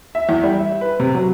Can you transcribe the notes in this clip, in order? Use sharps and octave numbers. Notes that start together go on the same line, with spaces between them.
E5
E2
G3
E5
B4
C3
F#3